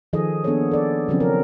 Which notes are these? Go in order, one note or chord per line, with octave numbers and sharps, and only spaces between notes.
D#3 F3 G#4 A4 D#5
A#3 B3 D4 G#4 A4 C#5
A4 D5
C#3 F3 F#3 C4 C#4
A#4